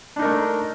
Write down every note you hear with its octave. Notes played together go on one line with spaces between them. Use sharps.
A3 D4 D#4 A#4